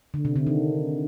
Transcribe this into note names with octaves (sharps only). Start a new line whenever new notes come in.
D3
C3
D3
D#3